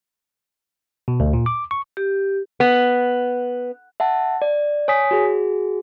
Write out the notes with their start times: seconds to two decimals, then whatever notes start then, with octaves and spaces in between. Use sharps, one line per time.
1.08 B2
1.20 D2
1.33 A#2
1.46 D6
1.71 C#6
1.97 G4
2.60 B3
4.00 E5 F#5 A5
4.42 D5
4.88 C#5 G#5 D#6 B6
5.11 F#4 G#4